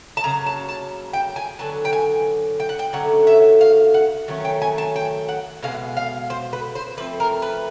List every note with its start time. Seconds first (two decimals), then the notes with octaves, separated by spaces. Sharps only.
0.17 A5
0.24 C#3 F#3 A#3 A#5
0.46 A5
0.69 A5
1.13 G5
1.36 G#5
1.59 D3 F#3 B3 A5
1.85 G5
1.93 G#5
2.60 G5
2.69 F#5
2.79 G5
2.93 D3 F#3 A3 C#4 F#5
3.27 E5
3.61 F5
3.94 F#5
4.28 D#3 F#3 A3 C#4
4.45 G5
4.62 G#5
4.78 A5
4.96 G5
5.29 F#5
5.63 B2 G#3 B3 F5
5.97 F5
6.30 C5
6.53 B4
6.75 C5
6.97 D3 F3 A3 C4 B4
7.20 A#4
7.42 B4